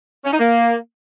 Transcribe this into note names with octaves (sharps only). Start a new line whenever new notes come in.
C#4
D#4
A#3